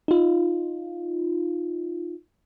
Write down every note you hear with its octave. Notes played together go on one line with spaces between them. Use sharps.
D#4 F4